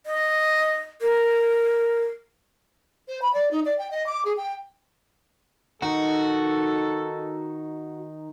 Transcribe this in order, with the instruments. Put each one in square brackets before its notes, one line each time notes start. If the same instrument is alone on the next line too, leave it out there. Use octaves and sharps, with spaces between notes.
[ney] D#5
A#4
[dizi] C5
B5
D5
D#4
D5
G5
D#5
D6
G#4
G5
[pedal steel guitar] D#3 D#4 [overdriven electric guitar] F#4 [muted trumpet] A4